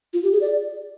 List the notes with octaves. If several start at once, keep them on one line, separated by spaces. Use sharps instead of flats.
F4
G4
G#4
D5